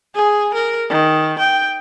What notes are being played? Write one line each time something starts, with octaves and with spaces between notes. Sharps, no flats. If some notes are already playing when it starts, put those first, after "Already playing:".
G#4
A#4
D#3
G5